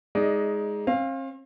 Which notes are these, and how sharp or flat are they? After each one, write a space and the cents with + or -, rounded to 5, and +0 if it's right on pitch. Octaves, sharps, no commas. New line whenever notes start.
G#3 +0 D#4 +15 D5 +0
C4 +45 F5 +0